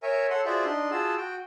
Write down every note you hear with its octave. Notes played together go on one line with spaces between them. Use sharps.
A#4 C#5 E5 G#5
A4 C#5 F#5 C6
F4 F#4 G#4 C5 D5 E5
D4 D#4 C6
F4 F#4 G#4 A5 E6
F#4 G5